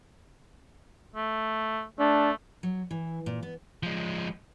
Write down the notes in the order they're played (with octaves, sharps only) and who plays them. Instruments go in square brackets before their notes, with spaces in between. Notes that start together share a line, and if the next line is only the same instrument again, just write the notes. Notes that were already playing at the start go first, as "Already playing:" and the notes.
[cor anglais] A3
[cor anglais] A3 [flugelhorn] D4
[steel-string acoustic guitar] F#3
E3
A#2
B3
[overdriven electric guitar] F3 G#3